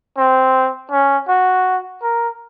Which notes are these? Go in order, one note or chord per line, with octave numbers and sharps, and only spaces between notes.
C4
C#4
F#4
A#4